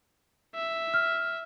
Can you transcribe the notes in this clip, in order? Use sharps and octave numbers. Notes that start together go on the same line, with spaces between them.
E5
F6